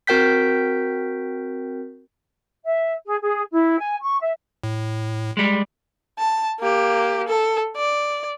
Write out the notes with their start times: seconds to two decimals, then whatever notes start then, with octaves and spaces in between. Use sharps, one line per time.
0.07 C4 F#4 A#4 G5 G6 B6
2.64 E5
3.04 G#4
3.21 G#4
3.51 E4
3.79 G#5
4.01 C#6
4.20 E5
4.64 A2
5.37 G3 G#3
6.18 A5
6.59 A#3 G4
7.28 A4
7.76 D5